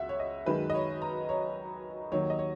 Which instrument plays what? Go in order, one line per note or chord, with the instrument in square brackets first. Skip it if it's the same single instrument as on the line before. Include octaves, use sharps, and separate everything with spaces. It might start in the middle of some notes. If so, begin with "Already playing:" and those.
Already playing: [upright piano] C#2 E5 F#5
C#5
D#5
F#2 D#3 G#3 B4
D#5
C#5
A#5
C#5
D#2 D#3 F#3 C#5
D#5
C#5